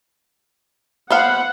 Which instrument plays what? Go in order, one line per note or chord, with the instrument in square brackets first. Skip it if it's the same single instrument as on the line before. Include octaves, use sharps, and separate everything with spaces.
[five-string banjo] B3 C5 F5 [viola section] F#5